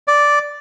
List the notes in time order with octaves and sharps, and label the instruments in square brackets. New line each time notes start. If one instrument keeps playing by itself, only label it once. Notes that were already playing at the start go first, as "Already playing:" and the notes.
[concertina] D5